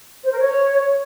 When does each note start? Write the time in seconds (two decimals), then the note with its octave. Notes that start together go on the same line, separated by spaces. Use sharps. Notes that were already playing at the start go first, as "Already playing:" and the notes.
0.24 C5
0.32 A#4
0.40 C#5